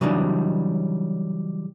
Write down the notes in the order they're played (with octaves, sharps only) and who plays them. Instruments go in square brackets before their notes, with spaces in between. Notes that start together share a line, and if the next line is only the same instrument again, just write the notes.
[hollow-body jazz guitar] C#3 E3 F#3 G3 D4 D#4